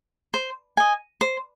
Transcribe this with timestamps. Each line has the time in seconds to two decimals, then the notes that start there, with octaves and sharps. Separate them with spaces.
0.34 C5
0.77 D#5 G#5
1.21 C5